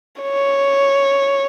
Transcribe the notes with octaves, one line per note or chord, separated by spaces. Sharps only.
C#5